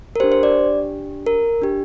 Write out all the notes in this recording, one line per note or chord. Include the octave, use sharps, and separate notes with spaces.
A#4
D4 G4 C5
C5
D5
A#4
D4 G4